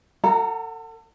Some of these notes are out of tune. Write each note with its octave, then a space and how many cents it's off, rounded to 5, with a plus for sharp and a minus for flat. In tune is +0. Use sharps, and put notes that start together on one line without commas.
A4 +40 F#5 +0 A#5 -15